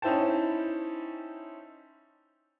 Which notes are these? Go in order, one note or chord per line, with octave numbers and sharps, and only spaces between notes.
C#4 D#4 E4 C5 G5 A5